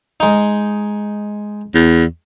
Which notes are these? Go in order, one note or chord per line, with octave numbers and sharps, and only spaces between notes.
G#3 D#4
E2